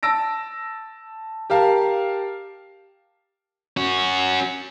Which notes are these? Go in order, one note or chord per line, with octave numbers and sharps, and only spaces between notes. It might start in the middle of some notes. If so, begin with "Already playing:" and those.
A5 E6 A#6 D7
G4 A#4 F5 A5
C#4 F#4